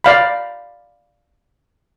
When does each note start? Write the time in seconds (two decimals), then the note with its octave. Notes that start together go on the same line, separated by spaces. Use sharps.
0.04 D5 F5 B5